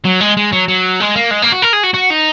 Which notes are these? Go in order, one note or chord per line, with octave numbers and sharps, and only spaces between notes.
F#3
G#3
G#3
F#3
F#3
G#3
A#3
G#3
A#3
F#4
A#4
G#4
F#4
F#4
D#4